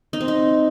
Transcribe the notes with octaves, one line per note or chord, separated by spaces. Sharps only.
D#4
C4
D#4